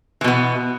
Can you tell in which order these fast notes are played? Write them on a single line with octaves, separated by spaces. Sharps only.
E3 B2 B3